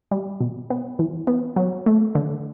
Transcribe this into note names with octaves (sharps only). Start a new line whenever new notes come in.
G3
B2
B3
E3
B3
F#3
A3
D3